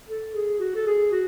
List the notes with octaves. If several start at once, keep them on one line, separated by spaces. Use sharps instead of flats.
A4
G#4
F#4
A4
G#4
F#4